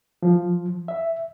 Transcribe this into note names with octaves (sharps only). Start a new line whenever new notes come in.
F3
E5